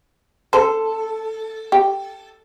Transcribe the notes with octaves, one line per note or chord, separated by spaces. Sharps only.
A4 C5
G4